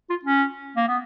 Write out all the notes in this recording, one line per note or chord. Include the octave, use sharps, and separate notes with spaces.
F4
C#4
A#3
B3